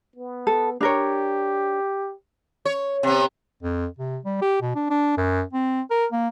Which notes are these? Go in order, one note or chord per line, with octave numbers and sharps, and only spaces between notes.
B3
A4
D4 G4 A#4 C#5
C#5
C3 B3
F2
C3
G3
G4
B2
D4
D4
F#2
C4
A#4
A#3